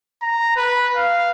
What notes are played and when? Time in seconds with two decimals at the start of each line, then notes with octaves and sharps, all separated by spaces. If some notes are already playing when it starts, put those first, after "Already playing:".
0.22 A#5
0.56 B4
0.96 F5